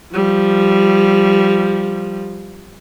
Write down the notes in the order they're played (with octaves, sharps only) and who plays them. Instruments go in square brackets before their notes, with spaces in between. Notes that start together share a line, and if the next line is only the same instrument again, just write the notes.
[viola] F3 G3